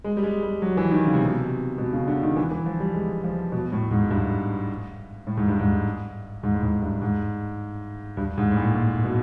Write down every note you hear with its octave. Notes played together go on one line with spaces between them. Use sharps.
G#3
G3
G#3
G3
F#3
E3
D#3
C#3
C3
B2
C3
B2
C#3
D3
D#3
E3
E3
F3
G3
G#3
F3
B2
A2
G#2
G2
A2
G#2
G2
G#2
G#2
A2
G#2
G2
G#2
G2
G#2
A2
A#2
A#2
B2